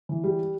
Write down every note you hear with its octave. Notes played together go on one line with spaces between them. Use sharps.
E3
G3